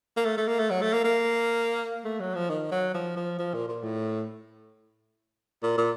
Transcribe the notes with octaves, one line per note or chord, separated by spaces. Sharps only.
A#3
A3
A3
A#3
A3
F#3
A3
A#3
A#3
A3
F#3
F3
D#3
F#3
F3
F3
F3
A#2
A#2
A2
A#2
A#2